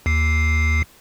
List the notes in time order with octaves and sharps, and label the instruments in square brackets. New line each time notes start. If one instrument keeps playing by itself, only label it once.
[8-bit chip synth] D#2 C7